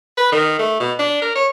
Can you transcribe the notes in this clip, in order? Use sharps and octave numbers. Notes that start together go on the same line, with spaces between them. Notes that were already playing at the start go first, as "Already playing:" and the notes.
B4
D#3
A3
B2
D4
A#4
C#5